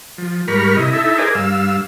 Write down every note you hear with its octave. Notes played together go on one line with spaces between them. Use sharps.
F3
G#2 G3 A#4 B5 C#6 F6
C3 E4 D#5
D#4 E4 A4 E5
G#4 A#4 C5 D5 D#5 G#5
G2 F5 E6